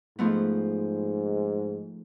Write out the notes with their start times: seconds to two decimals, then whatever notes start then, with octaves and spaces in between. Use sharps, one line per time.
0.19 G#2 F3 A3 B3